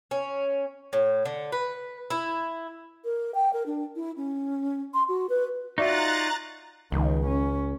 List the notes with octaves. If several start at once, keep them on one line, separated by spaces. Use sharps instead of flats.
C#4
A2
D3
B4
E4
A#4
G5
A#4
D4
E4
C#4
C6
F#4
B4
D#4 F4 F#4 D5 E5 A#5 F#6 A6
C#2 D#3
C#4